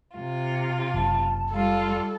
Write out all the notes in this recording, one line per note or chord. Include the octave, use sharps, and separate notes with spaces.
C3 F4
F#1 A5
G3 F4 A4 F5